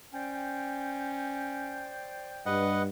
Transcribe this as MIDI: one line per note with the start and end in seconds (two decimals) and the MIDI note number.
0.13 1.93 61
0.13 2.60 72
0.13 2.60 74
0.13 2.60 79
2.46 2.87 43
2.46 2.82 71
2.46 2.82 75
2.46 2.82 78